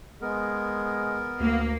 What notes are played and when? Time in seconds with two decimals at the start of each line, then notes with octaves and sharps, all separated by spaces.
0.21 G#3 B3 A#4
1.40 D2 A#3